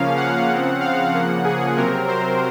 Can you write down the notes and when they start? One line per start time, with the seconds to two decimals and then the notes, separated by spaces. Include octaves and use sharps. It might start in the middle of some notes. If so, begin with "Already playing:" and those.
Already playing: C#3 F3 A#3 C#4 F5
0.17 F#5
0.49 C#3 F3 C4
0.81 F5
1.12 C#3 F3 A#3 F#5
1.45 G#4
1.77 C3 F#3 C4 A#4
2.08 C5